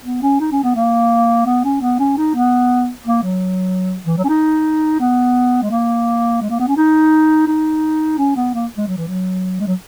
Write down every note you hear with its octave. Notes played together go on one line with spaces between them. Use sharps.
B3
C#4
D#4
C#4
B3
A#3
B3
C#4
B3
C#4
D#4
B3
A#3
F#3
E3
F#3
C#4
D#4
B3
G#3
A#3
G#3
A#3
B3
C#4
D#4
D#4
C#4
B3
A#3
G#3
F#3
E3
F#3
G#3
F#3